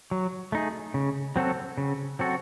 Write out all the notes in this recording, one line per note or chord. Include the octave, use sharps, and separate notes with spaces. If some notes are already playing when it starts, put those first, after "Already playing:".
F#3
A3 D#4 G#4
C#3
F#3 C4 F#4 A4
C#3
F#3 C4 F#4 A4